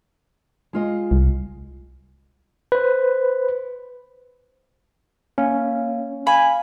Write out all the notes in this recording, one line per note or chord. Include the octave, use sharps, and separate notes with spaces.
G#3 F4 D#5
C2
B4 C5
A#3 C#4 F5
F5 G#5 B5